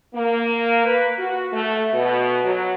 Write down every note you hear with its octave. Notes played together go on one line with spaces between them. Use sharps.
A#3
B4
F#4
A3
B2
F#3